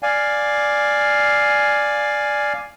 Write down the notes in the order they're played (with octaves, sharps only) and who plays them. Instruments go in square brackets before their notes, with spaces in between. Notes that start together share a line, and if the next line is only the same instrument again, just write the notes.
[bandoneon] D5 F5 G#5